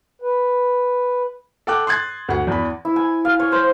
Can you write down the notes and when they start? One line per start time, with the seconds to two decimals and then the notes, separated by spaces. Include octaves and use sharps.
0.22 B4
1.67 A4 F#5 G5 D6 F#6
1.87 C6 D#6 F#6 G#6 A6
2.28 D2 F#5
2.47 E2 B5
2.85 E4
2.96 G#5
3.25 F5
3.40 C#5
3.52 C5